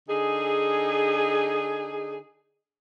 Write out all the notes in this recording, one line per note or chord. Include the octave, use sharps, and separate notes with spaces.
D3 D#4 G#4